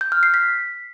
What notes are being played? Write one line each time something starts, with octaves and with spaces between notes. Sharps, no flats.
G6
F6
C7
B6